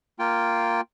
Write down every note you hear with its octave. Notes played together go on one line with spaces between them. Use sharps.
A#3 F4 G5